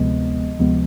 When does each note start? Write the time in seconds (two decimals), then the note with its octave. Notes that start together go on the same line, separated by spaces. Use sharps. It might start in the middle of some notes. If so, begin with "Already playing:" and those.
Already playing: D2 C3 F3 G#3 B3 D#5
0.59 D2 C3 F3 G#3 B3